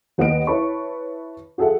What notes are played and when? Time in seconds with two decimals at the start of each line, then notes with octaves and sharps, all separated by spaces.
0.18 D#2 B3 B4 D#5 D7
0.47 E4 B4 C#5 A5 B5 C#6
1.58 F#4 G#4 A4 E5 F#5